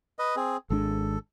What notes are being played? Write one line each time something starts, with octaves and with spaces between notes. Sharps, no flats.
B4 D#5
C4 G#4
G#1 G#3 D4 A4